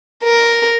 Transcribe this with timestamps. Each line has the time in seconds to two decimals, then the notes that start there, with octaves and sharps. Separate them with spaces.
0.24 A#4